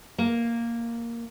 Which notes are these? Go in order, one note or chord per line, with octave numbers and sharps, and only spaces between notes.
A#3